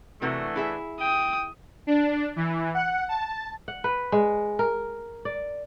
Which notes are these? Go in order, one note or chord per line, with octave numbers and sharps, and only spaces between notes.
C3 E3 A3 D4 F#4 A#4
E4 G#4 E5
G5 D#6
D4
E3
F#5
A5
F#5
B4
G#3
A#4
D5